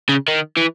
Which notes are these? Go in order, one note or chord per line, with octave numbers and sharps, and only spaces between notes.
C#3
D#3
E3